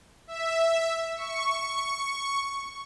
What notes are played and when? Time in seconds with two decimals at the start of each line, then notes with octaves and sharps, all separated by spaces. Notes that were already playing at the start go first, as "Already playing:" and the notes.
0.27 E5
1.15 C#6